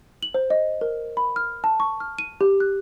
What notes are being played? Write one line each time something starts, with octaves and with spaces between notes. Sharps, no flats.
F#7
C5
D#5
A#4
B5
F6
A5
C#6
F6
D#7
G4
F#6